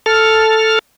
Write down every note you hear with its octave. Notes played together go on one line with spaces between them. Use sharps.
A4 F6